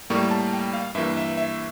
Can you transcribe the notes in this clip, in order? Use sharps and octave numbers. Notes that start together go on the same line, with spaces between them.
A2 G3 A#3 C#6
A5
G5
F5
G2 E3 A#3 E5
E5
E5